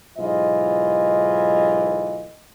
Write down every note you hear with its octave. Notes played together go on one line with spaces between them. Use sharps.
B1 G#2 E3 F4 D#5